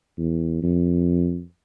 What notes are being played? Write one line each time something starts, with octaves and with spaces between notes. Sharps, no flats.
E2
F2